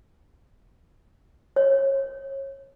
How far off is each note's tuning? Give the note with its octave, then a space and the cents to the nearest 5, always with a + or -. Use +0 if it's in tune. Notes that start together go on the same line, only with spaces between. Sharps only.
C#5 -30